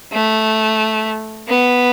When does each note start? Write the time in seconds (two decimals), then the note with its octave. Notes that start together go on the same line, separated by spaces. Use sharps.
0.13 A3
1.48 B3